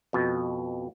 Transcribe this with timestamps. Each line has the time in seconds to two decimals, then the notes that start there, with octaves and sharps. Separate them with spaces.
0.13 F2 B2